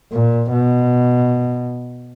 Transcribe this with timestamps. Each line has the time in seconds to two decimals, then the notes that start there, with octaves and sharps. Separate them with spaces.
0.12 A#2
0.52 B2